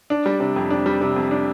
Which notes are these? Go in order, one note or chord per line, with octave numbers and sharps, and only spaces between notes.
D4
G3
C3
F2
D4
G3
C3
F2
D4